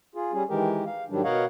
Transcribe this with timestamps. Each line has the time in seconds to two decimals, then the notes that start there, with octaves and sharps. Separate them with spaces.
0.15 F4 G#4
0.33 G3 C#4 G#4
0.49 D#3 E3 G#3 G4 A#4
0.86 F5
1.10 G#2 D#3 F#3 G3 D4
1.24 B2 A#4 C#5 D#5 F5 F#5